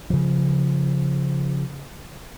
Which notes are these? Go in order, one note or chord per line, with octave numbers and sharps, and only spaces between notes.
C#3 F3